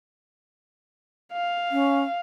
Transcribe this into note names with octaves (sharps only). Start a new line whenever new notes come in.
F5
C#4